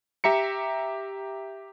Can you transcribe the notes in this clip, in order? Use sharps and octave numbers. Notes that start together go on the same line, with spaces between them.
G4 E5 A#5 C#7